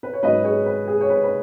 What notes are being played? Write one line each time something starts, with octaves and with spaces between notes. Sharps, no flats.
B4
C#5
G#2 F#3 C#4 B4 D#5
G#4 C#5
B4
G#4
C#5
B4
B4